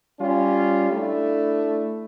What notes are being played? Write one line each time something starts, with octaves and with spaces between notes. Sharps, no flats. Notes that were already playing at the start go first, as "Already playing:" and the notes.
G3 C#4 F4
A3 D4 E4